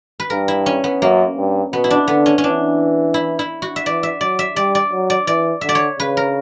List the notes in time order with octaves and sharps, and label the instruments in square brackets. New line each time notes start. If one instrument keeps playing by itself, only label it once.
[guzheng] B4
[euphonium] G2 [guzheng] A#4
[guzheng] E4
C#4
B3
[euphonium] F#2 [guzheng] A#3
[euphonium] G2
[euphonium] B2 [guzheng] B3
[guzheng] E4
D4
[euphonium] D3 [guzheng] B3
[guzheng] C#4
C#4
[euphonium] E3 [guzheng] D4
[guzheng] E4
E4
F#4
E5
[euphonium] E3 [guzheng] D5
[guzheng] E5
[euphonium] F#3 [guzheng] D5
[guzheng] E5
[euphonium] G3 [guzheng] D5
[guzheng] D5
[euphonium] F#3
[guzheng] D5
[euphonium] E3 [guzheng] D5
[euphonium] D3 [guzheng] E5
[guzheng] D5
C#5
[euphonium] C#3 [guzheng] B4
[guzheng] A#4